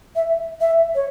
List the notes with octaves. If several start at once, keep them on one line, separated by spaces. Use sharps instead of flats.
E5
E5
C#5